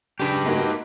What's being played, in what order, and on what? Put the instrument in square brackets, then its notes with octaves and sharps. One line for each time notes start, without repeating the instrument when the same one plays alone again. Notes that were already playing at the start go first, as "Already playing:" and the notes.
[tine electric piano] C#3 D4 G#4 [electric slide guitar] G4 B4
[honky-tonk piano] G#2 A#3 F#4